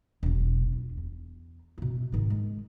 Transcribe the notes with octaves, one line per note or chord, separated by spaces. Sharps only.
E1 B1
F4
E2
B2 E4
G#2 D#3
G#3